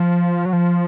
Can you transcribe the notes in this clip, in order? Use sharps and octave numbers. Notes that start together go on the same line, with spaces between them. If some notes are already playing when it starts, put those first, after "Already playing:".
Already playing: F3
F#3
F3